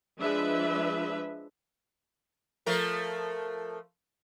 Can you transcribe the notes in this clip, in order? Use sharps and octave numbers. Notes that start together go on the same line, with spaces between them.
F3 G#3 D4 B4 E5
F3 A3 A#4